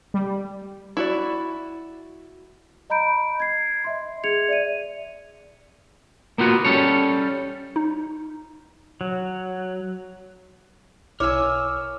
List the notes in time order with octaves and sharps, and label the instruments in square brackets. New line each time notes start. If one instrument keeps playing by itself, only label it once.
[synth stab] G3
[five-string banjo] E4 F#4 D5
[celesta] D#5 A#5 B5 G6 D7
G#6 C7
D#5 E5 C6
G#4 G#6 C#7 F7
D5 E5 D#7
[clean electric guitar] A#3 B3 F4 F#4
G3 C#4 A4 C#5
[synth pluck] D#4
[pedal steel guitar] F#3
[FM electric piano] B1 E4 F6 [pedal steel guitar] A#4 E6 [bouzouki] C#5 G#5 [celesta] D6